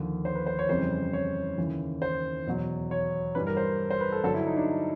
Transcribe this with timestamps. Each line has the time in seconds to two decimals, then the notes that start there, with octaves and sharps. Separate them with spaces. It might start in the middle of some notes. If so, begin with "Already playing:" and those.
Already playing: D#2 D3 F3
0.25 C5
0.35 B4
0.46 C5
0.59 C#5
0.69 F2 C#3 E3 G3 C5
1.13 C#5
1.58 D#2 C#3 E3
2.02 C5
2.47 E2 B2 F#3
2.91 C#5
3.35 G2 E3 G3 B4
3.47 A#4
3.57 C5
3.91 C5
4.01 B4
4.12 A4
4.24 G2 D3 F#3 A4
4.34 E4
4.46 D#4
4.57 D4